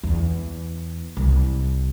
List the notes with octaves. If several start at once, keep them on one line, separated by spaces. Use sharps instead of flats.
E2
C2